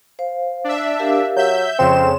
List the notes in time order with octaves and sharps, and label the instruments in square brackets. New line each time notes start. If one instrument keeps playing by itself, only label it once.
[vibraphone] C5 F5
[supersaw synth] D4 E5
[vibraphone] G4 A#4 F5
[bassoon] F#3 [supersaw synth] E5 G6
[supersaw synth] F2 C#3 E7 [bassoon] C4 [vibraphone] C#5 C6